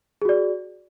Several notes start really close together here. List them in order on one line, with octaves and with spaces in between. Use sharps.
G#4 F#4 D5